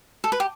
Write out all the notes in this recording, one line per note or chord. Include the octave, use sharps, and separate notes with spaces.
A4
B4
G4